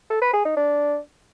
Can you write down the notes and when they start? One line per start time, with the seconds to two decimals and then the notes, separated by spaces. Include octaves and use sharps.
0.10 A4
0.22 B4
0.33 G#4
0.45 D#4
0.57 D4